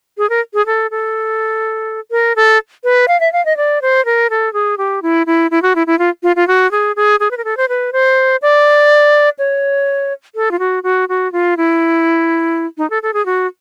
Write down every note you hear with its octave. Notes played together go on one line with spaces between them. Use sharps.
G#4
A#4
G#4
A4
A4
A#4
A4
B4
F5
E5
F5
D#5
D5
C5
A#4
A4
G#4
G4
E4
E4
E4
F#4
E4
E4
F4
F4
F4
F#4
G#4
G#4
G#4
B4
A#4
A4
C5
B4
C5
D5
C#5
A4
F4
F#4
F#4
F#4
F4
E4
D#4
A4
A4
G#4
F#4